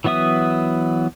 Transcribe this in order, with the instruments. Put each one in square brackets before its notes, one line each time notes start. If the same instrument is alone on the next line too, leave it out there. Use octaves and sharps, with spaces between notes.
[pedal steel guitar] E3 F#3 B3 E5 D#6